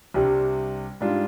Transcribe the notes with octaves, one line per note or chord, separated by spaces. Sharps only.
C2 C3 G3 D4
G#2 G3 D4 F4